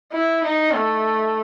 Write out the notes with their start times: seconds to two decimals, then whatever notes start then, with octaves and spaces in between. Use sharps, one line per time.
0.12 E4
0.44 D#4
0.74 A3